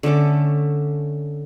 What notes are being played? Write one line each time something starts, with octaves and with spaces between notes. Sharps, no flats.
D3 A3 C#4 D6